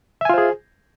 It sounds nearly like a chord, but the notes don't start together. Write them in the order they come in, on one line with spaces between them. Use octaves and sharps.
E5 G#5 F4 C5 G#4